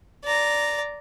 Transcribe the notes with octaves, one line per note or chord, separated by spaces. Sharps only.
D5 A#5